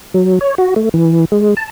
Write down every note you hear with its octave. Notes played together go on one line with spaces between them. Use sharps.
F#3
C#5
F#4
A3
E3
G#3
A5